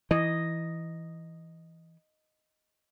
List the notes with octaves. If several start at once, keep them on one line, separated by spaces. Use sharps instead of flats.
E3 D#5